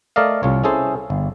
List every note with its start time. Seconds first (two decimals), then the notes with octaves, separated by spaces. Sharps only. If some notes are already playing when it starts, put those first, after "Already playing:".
0.16 A3 A#4 D5 D#5 F5
0.43 C2 F4 C#5
0.63 C#4 E4 G#4 A4 C5
1.10 G1